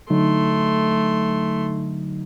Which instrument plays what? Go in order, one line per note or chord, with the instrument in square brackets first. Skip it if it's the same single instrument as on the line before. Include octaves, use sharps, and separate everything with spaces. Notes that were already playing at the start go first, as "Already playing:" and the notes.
[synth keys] D3 F#3 D#4 [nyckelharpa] A3 C6